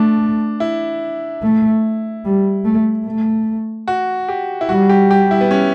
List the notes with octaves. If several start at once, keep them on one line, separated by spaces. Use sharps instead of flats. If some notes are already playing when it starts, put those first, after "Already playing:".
Already playing: A3 D4
E4
A3
G3
A3
A3
F#4
G4
E4
G3 F#4
G4
G4
E4
B3
C#4